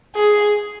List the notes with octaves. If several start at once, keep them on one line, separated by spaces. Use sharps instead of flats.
G#4